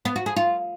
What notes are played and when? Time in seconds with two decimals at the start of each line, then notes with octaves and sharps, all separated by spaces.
0.05 B3
0.16 F#4
0.26 G#4
0.36 F4